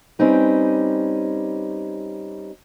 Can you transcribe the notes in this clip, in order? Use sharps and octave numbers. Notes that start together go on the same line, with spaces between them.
G3 C4 C#4 D#4 B4